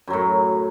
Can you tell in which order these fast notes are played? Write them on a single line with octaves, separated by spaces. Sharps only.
F#2 F#3 A2